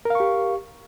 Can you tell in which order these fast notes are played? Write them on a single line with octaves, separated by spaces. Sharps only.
A#4 F5 C#6 G4